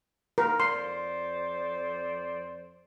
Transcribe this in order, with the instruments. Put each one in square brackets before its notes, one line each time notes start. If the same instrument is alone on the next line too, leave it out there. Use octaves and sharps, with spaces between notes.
[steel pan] A#4
[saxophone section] F2 C5 D5 [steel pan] C6